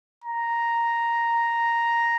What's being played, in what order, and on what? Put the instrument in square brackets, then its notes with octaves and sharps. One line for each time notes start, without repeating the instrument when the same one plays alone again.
[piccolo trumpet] A#5